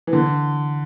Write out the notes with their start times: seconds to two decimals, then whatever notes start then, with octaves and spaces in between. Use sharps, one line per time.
0.07 E3
0.13 D3